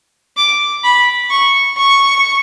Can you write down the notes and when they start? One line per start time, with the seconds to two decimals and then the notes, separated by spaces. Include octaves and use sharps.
0.37 D6
0.84 B5
1.30 C#6
1.78 C#6